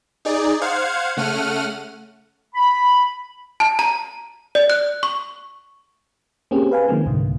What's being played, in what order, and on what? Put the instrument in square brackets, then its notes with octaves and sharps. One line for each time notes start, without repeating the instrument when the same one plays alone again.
[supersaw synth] D#4 G#4 D5
C5 F5 F#5 G#6
C#3 A3 F#5 F6 D#7
[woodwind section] B5
[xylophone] A5
A#5
D5
F#6
C#6
[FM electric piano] A#3 C4 C#4 G4 G#4
B4 F5 G#5
D#3 F3 G#3 A#3 C4
C2 G#2 D3